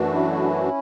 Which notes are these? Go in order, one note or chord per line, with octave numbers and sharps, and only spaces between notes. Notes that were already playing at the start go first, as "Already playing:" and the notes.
Already playing: F#2 E3 A3 D4 F#4
C#4 E4